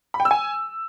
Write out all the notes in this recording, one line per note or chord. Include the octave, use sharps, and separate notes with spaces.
B5
G5
E6
G#5